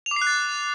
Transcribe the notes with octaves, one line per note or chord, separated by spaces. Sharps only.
F7
D6
C7
F#6
A6